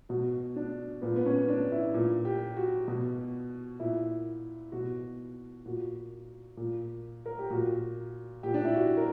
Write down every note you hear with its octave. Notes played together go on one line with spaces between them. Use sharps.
B2 F#4
D4
A#2 B3
B3
C#4
D4
E4
A#2
G4
F#4
B2
A#2 E4
B2 F#4
A#2 F#4
A#2
A#4
G4
A#2 F#4
A#2 G4
D4
E4
F#4
A#4